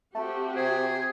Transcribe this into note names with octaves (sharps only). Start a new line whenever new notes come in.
A3 C4 F#4 G4
C3 G#4